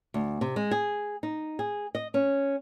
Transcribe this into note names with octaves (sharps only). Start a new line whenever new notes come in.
D2
C3
G#3
G#4
D#4
G#4
D#5
C#4